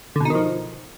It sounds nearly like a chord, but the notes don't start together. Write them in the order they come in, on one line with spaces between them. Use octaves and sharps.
D3 B2 D#4 D#3 F3